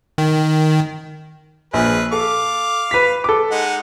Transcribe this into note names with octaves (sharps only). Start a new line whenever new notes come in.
D#3
A#1 G#4 B4
A4 F5 D6
B4 B6
A4 D6
G#3 D#4 F#5